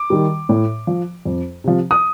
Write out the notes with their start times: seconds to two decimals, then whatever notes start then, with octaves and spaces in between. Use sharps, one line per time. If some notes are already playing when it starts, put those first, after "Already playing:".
Already playing: D6
0.10 D#3 G3
0.49 A2
0.87 F3
1.25 F2
1.64 C3 F3
1.91 D#6